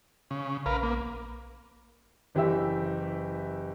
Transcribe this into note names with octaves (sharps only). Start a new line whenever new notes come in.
C#3
A#1 A#4 B4 F5
A#3
F#1 E3 G4 E5 E6